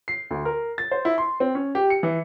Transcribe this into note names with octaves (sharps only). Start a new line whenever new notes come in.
C7
D2
A#4
A6
C5
E4
C6
C4
C#4
G4
C#7
E3